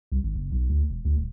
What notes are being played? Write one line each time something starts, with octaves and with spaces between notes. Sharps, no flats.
C2
G#1
F#1
B1
D2
E1
D2
D#1